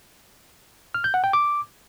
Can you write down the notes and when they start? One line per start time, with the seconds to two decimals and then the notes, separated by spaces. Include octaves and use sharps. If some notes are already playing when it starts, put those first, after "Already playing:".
0.94 F6
1.04 G6
1.14 F#5
1.24 G5
1.33 D6